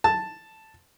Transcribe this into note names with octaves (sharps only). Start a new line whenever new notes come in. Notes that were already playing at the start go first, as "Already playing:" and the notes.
A5